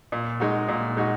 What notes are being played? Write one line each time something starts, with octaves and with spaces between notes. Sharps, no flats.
A#2
G#3 D#4 F#4
A#2
G#3 D#4 F#4